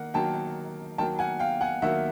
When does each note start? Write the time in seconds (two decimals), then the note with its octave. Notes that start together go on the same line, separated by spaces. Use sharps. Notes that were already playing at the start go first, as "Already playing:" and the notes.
Already playing: D#3 A#3 F#5
0.14 D#3 F#3 A#3 G5 A5
0.98 D#3 F#3 A#3 G5 A5
1.19 F#5 G#5
1.39 F5 G5
1.61 F#5 G#5
1.82 D#3 F#3 A#3 E5 F#5